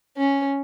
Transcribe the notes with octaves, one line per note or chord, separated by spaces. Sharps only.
C#4